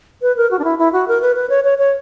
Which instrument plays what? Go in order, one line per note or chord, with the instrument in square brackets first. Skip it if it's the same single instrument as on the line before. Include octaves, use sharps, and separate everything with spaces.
[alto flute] B4
A#4
F#4
D4
E4
E4
F#4
A#4
B4
B4
C#5
C#5
C#5